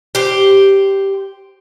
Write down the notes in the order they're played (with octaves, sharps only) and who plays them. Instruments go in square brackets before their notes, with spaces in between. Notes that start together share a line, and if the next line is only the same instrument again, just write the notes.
[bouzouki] G4 C5